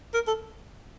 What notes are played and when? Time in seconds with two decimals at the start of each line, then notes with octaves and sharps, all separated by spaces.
0.14 A#4
0.27 A4